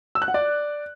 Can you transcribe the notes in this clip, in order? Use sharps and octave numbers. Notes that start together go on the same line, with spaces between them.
E6
F#6
F#5
D5